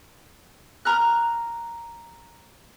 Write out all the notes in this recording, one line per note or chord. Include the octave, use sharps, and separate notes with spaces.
A#5 F6 F#6